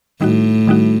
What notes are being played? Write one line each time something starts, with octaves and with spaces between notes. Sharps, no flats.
A2 D#3 G3 D#4 F#4
D#3 G3 D#4 F#4